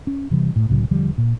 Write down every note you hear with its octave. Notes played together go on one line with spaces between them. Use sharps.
C#4
C3 E3 G3
A2
C2 A2 C#3 F#3
E1 D3 F3 G3
A#2